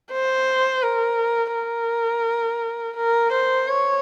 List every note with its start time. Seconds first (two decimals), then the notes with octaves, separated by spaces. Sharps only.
0.12 C5
0.83 A#4
1.54 A#4
2.97 A#4
3.32 C5
3.68 C#5